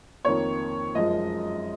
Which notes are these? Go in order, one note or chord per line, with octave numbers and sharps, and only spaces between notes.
F2 D#3 A#3 C#5
F#2 F3 G#3 D#5